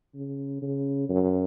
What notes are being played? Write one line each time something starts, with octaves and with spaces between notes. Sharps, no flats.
C#3
C#3
F#2